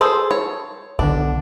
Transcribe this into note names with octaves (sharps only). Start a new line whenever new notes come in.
G#4 A4 C5
C#5
B1 D3 D4